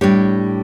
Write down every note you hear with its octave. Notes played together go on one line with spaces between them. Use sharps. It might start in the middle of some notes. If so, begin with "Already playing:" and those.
A2 G3 D4 G4 C#5